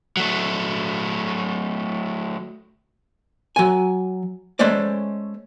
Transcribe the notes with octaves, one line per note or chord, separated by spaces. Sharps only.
F#3 A3
F#3 G#5
G#3 A3 C#4 C5 D5